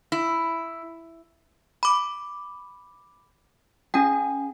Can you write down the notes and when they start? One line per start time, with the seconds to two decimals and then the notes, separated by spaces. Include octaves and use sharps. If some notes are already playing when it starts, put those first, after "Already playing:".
0.12 E4
1.83 B5 D6
3.94 C#4 G#4 G5